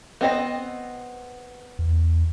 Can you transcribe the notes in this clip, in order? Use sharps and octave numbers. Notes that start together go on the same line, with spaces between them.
B3 C4 D#5
E2